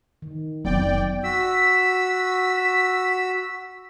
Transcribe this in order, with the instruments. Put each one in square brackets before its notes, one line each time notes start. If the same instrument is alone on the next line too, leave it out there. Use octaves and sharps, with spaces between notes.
[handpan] D#3
[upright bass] F1 [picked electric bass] F#3 B3 C4 [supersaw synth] D5 G5
[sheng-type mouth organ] F#4 E6 [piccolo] B6